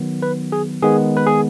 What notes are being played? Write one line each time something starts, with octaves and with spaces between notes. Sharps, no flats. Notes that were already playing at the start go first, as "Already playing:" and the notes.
Already playing: D#3 F#3 B3
B4
G#4
D#3 G#3 B3 G#4
B4
G#4